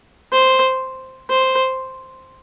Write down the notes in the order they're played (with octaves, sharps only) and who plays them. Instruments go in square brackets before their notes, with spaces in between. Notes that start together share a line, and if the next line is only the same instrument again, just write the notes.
[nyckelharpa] C5
C5